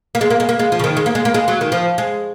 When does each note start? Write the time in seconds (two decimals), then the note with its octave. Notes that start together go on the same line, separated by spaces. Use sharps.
0.15 A#3
0.21 G#3
0.30 A#3
0.40 G#3
0.49 A#3
0.59 G#3
0.72 F3
0.79 C#3
0.84 D#3
0.97 G#3
1.06 A#3
1.15 G#3
1.25 A#3
1.34 G#3
1.48 F#3
1.61 D#3
1.72 F3
1.98 G#3